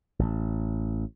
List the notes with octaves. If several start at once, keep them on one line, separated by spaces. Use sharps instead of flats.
A1